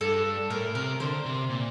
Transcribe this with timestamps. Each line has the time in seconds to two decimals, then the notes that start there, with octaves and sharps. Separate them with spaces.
0.01 G2 A4
0.50 A2 A#4
0.75 C3 A#4
1.00 D3 C5
1.26 C3
1.50 A#2